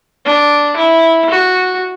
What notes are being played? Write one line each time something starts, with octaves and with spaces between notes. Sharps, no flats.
D4
E4
F#4